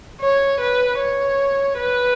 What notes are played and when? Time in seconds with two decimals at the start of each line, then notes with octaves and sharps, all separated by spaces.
0.21 C#5
0.60 B4
0.99 C#5
1.77 B4